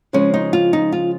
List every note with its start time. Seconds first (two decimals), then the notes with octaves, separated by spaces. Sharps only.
0.13 C#3 F3 G#3 C#4
0.34 D#4
0.53 F4
0.73 D#4
0.92 F4